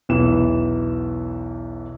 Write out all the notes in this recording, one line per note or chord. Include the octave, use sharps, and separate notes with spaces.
B1 E2 E3 E7